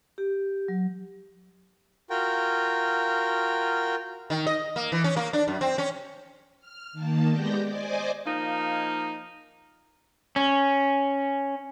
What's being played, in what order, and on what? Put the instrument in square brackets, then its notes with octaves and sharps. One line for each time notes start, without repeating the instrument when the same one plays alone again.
[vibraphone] G4
F#3
[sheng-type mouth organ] F4 F#4 A#4 G5
[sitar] D#3
D#5
A#3
E3
C#4
A#3
D4
F#2
C4
C#4
[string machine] F6
D#3 A#3 A5
G#3 B3 G4 D5 G6 A#6
C5 D5 D#5 G#5 D6
[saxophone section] F3 A#3 D#4
[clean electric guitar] C#4